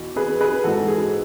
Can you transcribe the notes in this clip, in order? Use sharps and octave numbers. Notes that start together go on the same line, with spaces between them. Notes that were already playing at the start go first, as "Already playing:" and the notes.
Already playing: E2 B2
G#4 B4
G#4 B4
G#2 E3 F#4 A4
G#4